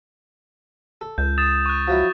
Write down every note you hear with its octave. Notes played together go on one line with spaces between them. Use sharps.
A4
C#2 G6
D#6 A6 E7
C#6 F#6
F3 F#3 E4